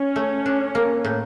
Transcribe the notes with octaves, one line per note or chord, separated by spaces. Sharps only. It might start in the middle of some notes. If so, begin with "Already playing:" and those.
Already playing: C#4
A3
D4
A#3
A2